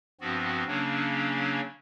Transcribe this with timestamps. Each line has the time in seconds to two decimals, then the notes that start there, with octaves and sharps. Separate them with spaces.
0.21 G2 F3 B3 C4 F#4
0.67 C#3 F#3 A#3 C#4 D4